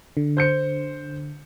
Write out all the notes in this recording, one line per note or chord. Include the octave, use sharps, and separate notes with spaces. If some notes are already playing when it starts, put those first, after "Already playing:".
D3
C5 G6 C#7